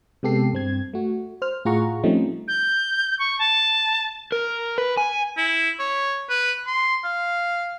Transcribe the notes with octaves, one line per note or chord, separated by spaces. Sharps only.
C3 G#3 B3 G4 A4 C7
G2 C4 G#6
A3 F#4
C5 F6
A2 F4 G#4 F#5 A#5 C#6
F3 G3 A3 C4 C#4 D#4
G6
C#6
A5
A#4
B4
G#5
E4
C#5
B4
C6
F5